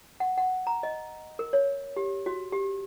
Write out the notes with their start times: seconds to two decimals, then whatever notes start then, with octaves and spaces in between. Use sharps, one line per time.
0.20 F#5
0.38 F#5
0.67 A#5
0.83 D#5
1.39 A#4
1.53 C#5
1.96 G4
2.26 F#4
2.52 G4